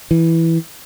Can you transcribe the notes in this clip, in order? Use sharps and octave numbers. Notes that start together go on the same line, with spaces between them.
E3